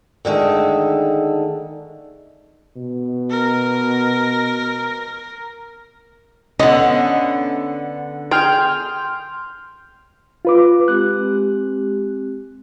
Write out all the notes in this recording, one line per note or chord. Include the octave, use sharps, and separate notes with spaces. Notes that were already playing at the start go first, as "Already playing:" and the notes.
D3 D#3 G#3 A3
B2
A#4
D3 B3 C#4 D#5
G#4 G5 C6 F6 G6
F4 B4 D6
G#3 C4 G4 F#6